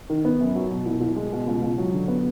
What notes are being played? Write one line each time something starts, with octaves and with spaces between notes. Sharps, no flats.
D#3
B3
F#2
F#3
B2
C2
C2
G#3
B2
C#2
C#2
F#3
D3
B3